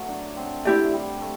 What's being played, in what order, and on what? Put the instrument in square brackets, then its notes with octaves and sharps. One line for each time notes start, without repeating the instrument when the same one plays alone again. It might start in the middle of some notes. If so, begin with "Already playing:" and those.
Already playing: [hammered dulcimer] F#3 A3 B3
D4
C4
[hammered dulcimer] A3 [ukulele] E4 G4 D5
[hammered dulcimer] G3
A3